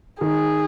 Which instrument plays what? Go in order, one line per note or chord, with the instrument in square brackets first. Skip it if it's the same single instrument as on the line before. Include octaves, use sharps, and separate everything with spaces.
[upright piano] D#3 [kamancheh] G#4